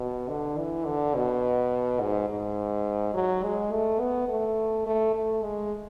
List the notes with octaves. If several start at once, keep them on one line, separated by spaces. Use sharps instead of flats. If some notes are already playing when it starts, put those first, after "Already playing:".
Already playing: B2
D3
E3
D3
B2
G#2
G#2
F#3
G#3
A3
B3
A3
A3
A3
G#3